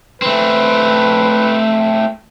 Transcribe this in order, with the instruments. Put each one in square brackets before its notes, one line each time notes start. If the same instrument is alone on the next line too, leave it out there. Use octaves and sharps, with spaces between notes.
[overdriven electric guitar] A3 C4 [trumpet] B4